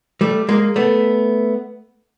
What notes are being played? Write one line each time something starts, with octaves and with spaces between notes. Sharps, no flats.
G3 A3
G#3 A#3
A3 B3